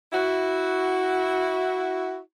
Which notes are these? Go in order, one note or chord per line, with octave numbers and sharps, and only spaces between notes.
E4 F#4